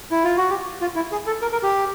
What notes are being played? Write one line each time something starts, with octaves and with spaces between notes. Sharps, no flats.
E4
F4
F#4
G4
F4
E4
G#4
A4
A#4
A#4
G4